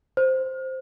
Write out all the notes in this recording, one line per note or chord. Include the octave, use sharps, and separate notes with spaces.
C5